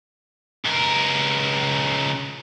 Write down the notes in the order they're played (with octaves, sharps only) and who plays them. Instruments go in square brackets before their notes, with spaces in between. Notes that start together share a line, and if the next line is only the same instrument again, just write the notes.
[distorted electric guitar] C#2 A#4